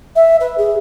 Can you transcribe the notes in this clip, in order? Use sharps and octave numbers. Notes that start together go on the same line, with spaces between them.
E5
B4
G#4